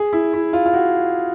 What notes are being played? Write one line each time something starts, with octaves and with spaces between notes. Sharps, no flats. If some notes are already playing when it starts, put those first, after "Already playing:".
Already playing: G#4
E4
E4
F4
F4
F#4